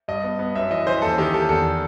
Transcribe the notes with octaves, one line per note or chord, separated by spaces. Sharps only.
G2 D#5
B3
B3
F#2 E5
E3 D#5
E3 C5
D#2 A4
D#3 G4
D#3 A4
E2 A4